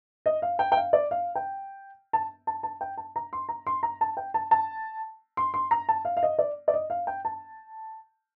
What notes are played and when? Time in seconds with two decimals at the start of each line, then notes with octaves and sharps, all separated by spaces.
0.26 D#5
0.42 F5
0.59 G5
0.72 G5
0.77 F5
0.93 D5
1.11 F5
1.35 G5
2.13 A5
2.47 A5
2.63 A5
2.81 G5
2.97 A5
3.16 A#5
3.33 C6
3.49 A#5
3.67 C6
3.83 A#5
4.01 A5
4.17 G5
4.34 A5
4.51 A5
5.37 C6
5.54 C6
5.71 A#5
5.89 A5
6.05 F5
6.17 F5
6.23 D#5
6.39 D5
6.68 D5
6.74 D#5
6.90 F5
7.07 G5
7.25 A5